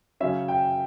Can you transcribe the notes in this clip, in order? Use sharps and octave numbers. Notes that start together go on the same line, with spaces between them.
C#3 F#3 C#4 E5
G5